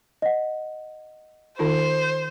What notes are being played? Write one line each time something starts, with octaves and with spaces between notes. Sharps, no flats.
D#5 F#5
D#3 D#4 F4 C5